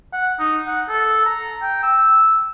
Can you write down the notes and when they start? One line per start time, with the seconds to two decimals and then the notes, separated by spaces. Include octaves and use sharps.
0.13 F#5
0.39 D#4
0.67 F#5
0.89 A4
1.25 A#5
1.62 G5
1.83 E6